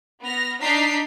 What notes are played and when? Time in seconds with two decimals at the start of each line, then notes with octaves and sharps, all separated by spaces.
0.22 B3 F6 A#6
0.62 D4 D#4 A#5 B6 C7